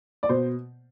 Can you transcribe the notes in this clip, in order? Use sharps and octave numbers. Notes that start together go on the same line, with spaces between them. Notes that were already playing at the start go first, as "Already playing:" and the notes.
D5
B2 C5